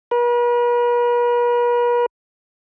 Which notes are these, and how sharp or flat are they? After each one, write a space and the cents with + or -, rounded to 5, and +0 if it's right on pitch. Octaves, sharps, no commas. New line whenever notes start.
B4 -45